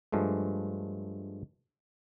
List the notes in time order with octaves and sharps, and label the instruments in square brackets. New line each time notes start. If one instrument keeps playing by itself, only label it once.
[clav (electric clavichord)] G2 F3 G#3 A3